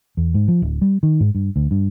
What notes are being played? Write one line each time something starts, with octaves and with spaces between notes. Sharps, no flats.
E2
G#2
F3
D1
G3
D#3
G#2
G2
D2
G2